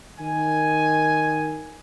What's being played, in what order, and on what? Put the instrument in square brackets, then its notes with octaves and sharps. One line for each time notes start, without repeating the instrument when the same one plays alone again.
[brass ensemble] D#3 G#5